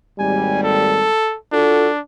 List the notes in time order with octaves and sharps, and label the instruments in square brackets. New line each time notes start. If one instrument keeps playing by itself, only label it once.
[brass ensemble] G#1 D#2 G3 [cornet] G#5
[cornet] A4
[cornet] D4 [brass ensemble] F4 F#4 A4